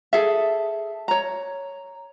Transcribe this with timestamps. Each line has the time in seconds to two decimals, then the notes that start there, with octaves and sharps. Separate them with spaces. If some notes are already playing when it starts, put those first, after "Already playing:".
0.13 G#4 A4 E5
1.08 C#5 A#5